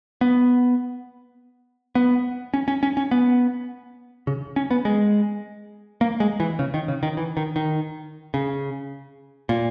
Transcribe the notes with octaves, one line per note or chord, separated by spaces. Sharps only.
B3
B3
C#4
C#4
C#4
C#4
B3
C#3
C#4
B3
G#3
A#3
G#3
E3
C#3
D#3
C#3
D#3
E3
D#3
D#3
C#3
A#2